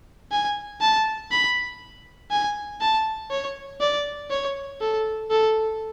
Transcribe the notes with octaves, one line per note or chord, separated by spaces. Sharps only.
G#5
A5
B5
G#5
A5
C#5
D5
C#5
A4
A4